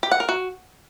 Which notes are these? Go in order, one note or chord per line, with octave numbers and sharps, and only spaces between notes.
G4
F#5
A#4
F#4